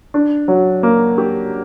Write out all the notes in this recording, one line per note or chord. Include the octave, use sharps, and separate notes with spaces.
D4
F#3
A#3
G4